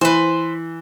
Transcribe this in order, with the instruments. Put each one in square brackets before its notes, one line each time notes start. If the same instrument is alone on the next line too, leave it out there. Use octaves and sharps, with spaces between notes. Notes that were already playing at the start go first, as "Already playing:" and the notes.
[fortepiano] E3 [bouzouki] B4 C5